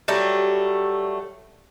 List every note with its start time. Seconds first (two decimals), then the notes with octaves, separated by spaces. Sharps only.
0.08 F#3 G3 A3